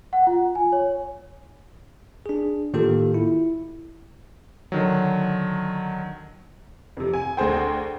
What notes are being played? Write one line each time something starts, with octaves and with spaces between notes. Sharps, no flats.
F#5
F4
G#5
C#5
D4 G#4
A2 D#3 A#3 F4 G4 A4
E4
D3 D#3 F#3
F2 C3
G#5
D2 G#4 C5 G5